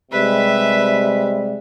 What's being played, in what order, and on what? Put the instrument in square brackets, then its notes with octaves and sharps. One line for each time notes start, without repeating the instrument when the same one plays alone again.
[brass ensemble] C3 G3 G#3 [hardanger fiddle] B4 E5